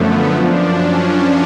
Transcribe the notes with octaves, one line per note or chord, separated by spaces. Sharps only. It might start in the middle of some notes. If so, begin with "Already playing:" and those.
Already playing: F#2 D3 F3 A3 B3
F#2 F3 D4
C#4